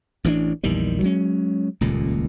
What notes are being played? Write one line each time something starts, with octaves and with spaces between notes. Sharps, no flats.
A1 E3 F#3 D4
A#1 E2 D#3 G3
F#3 G#3 C#4
D#1 C#2 A#2